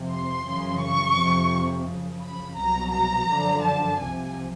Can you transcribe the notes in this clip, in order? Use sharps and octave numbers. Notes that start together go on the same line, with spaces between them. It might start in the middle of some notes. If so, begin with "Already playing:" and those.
Already playing: F2 C3 F3
C6
F#2 C#3 E3
C#6
F2 C3 F3
F#2 C#3 F3
B5
C2 B2 F#3 A#5
A#5
F#2 D3 F3
A5
C2 C3 F3 G#5